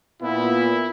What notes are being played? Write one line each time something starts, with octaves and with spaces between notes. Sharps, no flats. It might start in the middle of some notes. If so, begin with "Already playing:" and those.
A#2 B3 E4